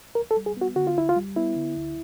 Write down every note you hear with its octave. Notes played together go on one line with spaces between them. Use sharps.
D2 A#4
A4
G3
G#4
B3 F#4
D3 F#4
F4
D2 E4
F4
G3
B3 E4
D3
D2